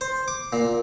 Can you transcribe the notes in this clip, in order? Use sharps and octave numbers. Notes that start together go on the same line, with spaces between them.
C5
D6
A#2